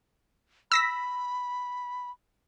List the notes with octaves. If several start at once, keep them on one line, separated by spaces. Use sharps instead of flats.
B5 E6 A#6 B6